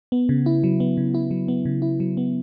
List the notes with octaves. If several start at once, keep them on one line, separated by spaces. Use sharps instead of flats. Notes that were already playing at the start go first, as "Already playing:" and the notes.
B3
C#3
E4
F#3
B3
C#3
E4
F#3
B3
C#3
E4
F#3
B3